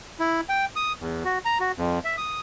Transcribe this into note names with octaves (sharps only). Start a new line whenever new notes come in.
E4
G5
D#6
E2
F#4
A#5
F#4
F2
E5
D#6